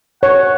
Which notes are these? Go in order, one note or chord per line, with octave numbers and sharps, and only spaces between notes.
C#5 F#5